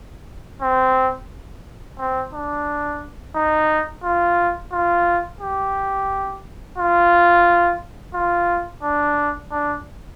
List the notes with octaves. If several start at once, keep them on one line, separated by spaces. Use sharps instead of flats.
C4
C4
D4
D#4
F4
F4
G4
F4
F4
D4
D4